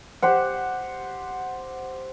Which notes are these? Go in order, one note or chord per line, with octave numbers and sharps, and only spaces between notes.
G4 C5 F#5